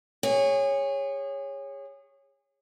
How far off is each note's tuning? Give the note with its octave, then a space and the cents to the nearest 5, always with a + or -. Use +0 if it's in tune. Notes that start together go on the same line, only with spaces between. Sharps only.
G#4 -30 C#5 +0